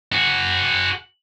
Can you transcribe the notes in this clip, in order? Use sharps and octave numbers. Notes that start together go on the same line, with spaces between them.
F#4 G#4